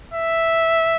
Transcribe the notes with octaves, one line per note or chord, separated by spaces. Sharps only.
E5